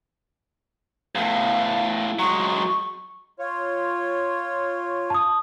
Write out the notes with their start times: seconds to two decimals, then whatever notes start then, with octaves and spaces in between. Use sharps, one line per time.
1.15 E2 A2 F5
2.19 F#3 G#3 C#6
3.39 F4 C#5
5.10 A5 D#6